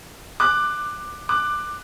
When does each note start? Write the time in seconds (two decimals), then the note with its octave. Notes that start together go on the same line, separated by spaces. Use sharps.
0.40 D6 F#6
1.29 D6 F#6